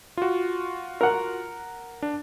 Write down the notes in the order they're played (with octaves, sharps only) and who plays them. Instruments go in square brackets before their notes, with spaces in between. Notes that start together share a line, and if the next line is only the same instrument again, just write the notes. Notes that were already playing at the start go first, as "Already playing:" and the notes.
[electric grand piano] F4 F#4
[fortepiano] A#4 F#5
[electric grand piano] D4